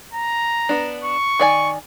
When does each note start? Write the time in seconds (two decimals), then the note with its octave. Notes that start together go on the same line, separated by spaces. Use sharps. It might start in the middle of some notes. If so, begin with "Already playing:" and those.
0.13 A#5
0.69 B3 D4
1.04 C#6
1.39 D#3 D5 G#5